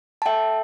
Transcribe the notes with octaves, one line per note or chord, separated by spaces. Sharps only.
A5
A4 E5 G5